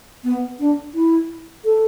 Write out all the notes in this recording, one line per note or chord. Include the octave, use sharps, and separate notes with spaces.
B3
D4
E4
A4